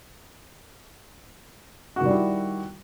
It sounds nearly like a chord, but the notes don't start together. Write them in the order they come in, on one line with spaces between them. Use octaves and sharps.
F#4 D#3 G3 E4